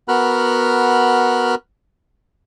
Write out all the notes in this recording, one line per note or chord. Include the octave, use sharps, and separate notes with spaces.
B3 F#4 A#4 B5 F6 F#6